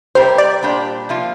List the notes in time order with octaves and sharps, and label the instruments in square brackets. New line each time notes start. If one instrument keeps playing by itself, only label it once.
[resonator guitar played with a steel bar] C3 G3 C4 G4 A#4 [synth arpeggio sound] C5
[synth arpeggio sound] D5
[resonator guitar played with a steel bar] A#2 G3 D4 G4 C5
C3 F3 A#3 F4